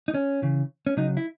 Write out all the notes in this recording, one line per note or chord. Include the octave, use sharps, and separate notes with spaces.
D#4
C#4
C#3 E3
C#4
C#3 F#3 D#4
E4